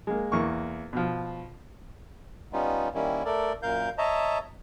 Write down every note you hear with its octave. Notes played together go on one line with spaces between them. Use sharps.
G#3 A#3
E2 A#3 C#6
B2 F3
G3 B3 C#4 D#4 F4
D#3 G3 A#3 C#4 E4
A3 A4 A#4 D5
F#2 A#2 A#4 F5 G6
C#5 D#5 E5 A5 A#5